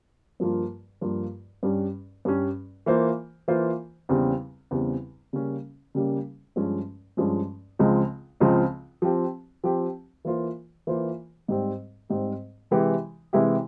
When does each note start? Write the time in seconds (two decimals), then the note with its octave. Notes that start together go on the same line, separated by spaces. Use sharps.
0.40 G2 F3 A#3 F4
1.01 G2 F3 A#3 F4
1.63 G2 G3 C#4
2.25 G2 G3 C#4
2.86 E3 A#3 F4 C5
3.48 E3 A#3 F4 C5
4.09 E2 C#3 G3 C4
4.71 E2 C#3 G3 C4
5.33 C#3 G3 A#3 C#4
5.95 C#3 G3 A#3 C#4
6.56 G2 F3 G#3 C#4
7.17 G2 F3 G#3 C#4
7.79 C#2 C#3 F3 G#3 C4
8.40 C#2 C#3 F3 G#3 C4
9.02 F3 C4 G4
9.64 F3 C4 G4
10.25 E3 A#3 F4 C5
10.87 E3 A#3 F4 C5
11.48 G#2 G3 C4
12.09 G#2 G3 C4
12.71 C3 E3 G#3 E4 G4
13.33 C3 E3 G#3 E4 G4